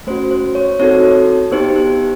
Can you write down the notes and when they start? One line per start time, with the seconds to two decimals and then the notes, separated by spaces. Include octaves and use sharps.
0.07 A3 C#4 F#4 C5
0.31 C5
0.55 C#5
0.79 C4 D#4 F#4 A4 C#5
1.52 B3 D#4 G4 C5
1.76 C5